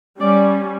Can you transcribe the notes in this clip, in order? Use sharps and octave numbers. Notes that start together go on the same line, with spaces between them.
G3 C#4 D5